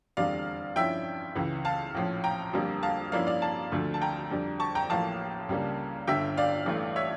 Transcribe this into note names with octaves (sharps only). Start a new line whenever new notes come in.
F1 E2 D3 G3 D5 F5
G2 F3 C#4 E4 E5 G5
C#2 C#3 E3
F5 A5
A#1 A2 F3 C#4
G5 A#5
F1 F2 D3 G3 A#3
F5 A5
G2 F3 A#3 C#4 E4 D5 F5
D5 F5
F5 A5
D2 D3 F3 A3
A5
G5 A#5
F2 D3 G3 D4
A5 C#6
G5 A#5
A1 A2 F3 A#3 F5 A5
C#2 C#3 G3 A#3 D4
G1 G2 D3 E5 G5
D5 F5
A1 G2 E3 A3
C#5 E5